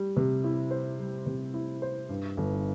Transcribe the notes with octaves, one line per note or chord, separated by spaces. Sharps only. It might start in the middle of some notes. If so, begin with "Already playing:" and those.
Already playing: G3
C3
E4
C5
G3
C3
E4
C5
G2
G1